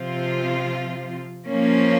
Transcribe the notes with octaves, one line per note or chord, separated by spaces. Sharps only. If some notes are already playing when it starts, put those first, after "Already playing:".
Already playing: C3 F3 C4 F4
F3 A#3 C#4